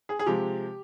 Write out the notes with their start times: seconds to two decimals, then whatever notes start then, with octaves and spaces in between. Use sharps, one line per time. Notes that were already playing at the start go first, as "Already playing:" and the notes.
0.09 G#4
0.19 G#4
0.26 C3 F3 G#3 G4